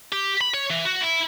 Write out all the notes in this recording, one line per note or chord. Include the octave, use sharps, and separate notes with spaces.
G4
B5
C#5
E3
F#4
E4